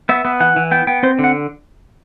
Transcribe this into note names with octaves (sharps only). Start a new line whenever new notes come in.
B3 E5
B3
E3 F#5
E3
B3 G5
B3 G5
C4 C5
D3
F#5